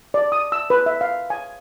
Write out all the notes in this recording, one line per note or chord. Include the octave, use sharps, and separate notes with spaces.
D5
D#6
E6
B4
E5
F5
G#5